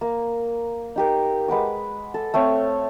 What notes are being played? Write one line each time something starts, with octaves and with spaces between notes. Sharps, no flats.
A#3
D#4 G4 A#4
G#3 B4 F#5 D6
A4
A3 C4 C#5 F5